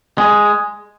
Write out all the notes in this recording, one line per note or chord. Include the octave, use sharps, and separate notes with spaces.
G#3